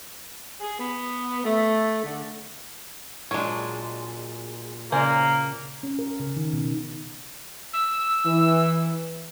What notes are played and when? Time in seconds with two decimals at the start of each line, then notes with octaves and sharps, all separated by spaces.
0.60 G#4
0.79 B3
1.44 A3
2.04 D3
3.31 A#2 F#3 G#3 D4 C#5
4.92 C#3 A#3 G#4 C5 D5
5.83 C#4
5.99 A#4
6.20 C#3
6.36 D#3
6.53 B2
7.73 E6
8.26 E3